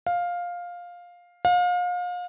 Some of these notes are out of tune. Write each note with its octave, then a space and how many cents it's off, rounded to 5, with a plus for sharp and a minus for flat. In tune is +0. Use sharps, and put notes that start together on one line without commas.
F5 +10
F5 +35